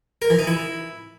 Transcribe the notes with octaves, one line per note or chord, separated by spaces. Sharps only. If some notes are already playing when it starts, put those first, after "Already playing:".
A#4
E3
D#4
E4